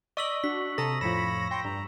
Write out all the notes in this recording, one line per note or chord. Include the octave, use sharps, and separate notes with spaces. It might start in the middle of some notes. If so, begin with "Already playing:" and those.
D5 D#5 C#6 E6 B6 F#7
D4 F#4 B6
C3 A4 A#5 D#6 A#6
F2 A2 F3 C#5 B5 A#6 E7
C#5 G5 C6
G2 A#5